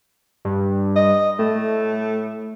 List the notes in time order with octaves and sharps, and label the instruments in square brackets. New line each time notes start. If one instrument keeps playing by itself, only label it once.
[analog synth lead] G2
[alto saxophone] D#5
[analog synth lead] A2 [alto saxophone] A3